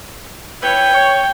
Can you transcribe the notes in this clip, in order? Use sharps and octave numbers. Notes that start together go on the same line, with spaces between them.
E3 B4 C#5 G5
C#5